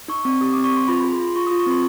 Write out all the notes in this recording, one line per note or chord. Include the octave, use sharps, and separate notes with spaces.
D#4 C#6
C4 C#6
G4 D#6
C4 D6
C#6
C4 C6
F4 B5
G#4 B5
C6
F4
C6
F4 C#6
F4 D#6
C#6
C4 C6